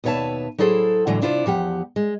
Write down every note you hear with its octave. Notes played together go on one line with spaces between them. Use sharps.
D#2 B2 B4 C#5 E5 A5
F#3 E4 G#4 A4 C5
A2 D3 E3 F#3 G#3
C3 D4 E4 F4 C5
E2 F3 G4 F#5
G#3